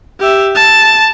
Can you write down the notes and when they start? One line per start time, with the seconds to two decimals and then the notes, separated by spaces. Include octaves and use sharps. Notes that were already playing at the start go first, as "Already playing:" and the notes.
0.20 G4 E5
0.55 A5